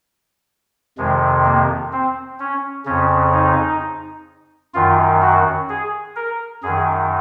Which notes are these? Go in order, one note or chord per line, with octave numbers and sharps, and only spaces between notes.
F2 C3 D#3 G#3
A#3
C4
C#4
F2 C#3 C#4
D#4
F#2 D#3 F4
F#4
G#4
A#4
F#2 D#3 G#4